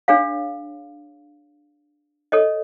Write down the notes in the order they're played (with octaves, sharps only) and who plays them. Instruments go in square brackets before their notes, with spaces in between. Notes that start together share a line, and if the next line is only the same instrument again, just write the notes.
[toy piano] D4 G#4 C#5 F5
A4 C#5 D#5